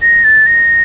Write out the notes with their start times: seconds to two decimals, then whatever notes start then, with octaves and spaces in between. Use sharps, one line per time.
0.02 A#6
0.24 A6
0.46 A#6